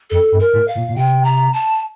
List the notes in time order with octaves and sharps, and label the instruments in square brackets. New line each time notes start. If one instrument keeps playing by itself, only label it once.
[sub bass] F2 [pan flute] A4
[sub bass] G2
[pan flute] A#4
[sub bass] A2
[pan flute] F5
[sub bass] A#2
A#2
[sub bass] C3 [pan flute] G5
[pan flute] A#5
A5